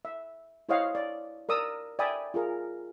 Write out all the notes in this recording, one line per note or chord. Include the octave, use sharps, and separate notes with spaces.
E5
E4 C5 C#5 D#5 F5 F#5
D5
A#4 D5 D#6 E6
D5 E5 G5 G#5 B5 D#6
F4 G#4 A#4